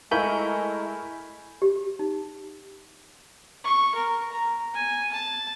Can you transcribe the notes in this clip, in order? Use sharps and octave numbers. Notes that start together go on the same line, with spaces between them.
G#3 A3 E4 A#4 G#5 B5 C#6 G6
G4
D#4
C#6
A#4
A#5
G#5
A5